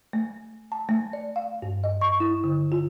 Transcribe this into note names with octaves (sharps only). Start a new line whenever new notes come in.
A3
A5
A3
D5
F5
G2
D#5
C#6
E4
D3
F4